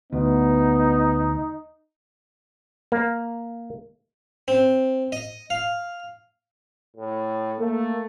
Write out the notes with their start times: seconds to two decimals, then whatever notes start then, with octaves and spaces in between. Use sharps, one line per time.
0.13 D2 B3 D#4
2.92 A#3
4.48 C4
5.12 D#5
5.50 F5
6.97 A2
7.60 A3 A#3